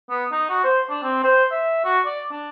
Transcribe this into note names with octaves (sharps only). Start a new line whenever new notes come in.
B3
D#4
F#4
C5
D4
C4
C5
E5
F#4
D5
D4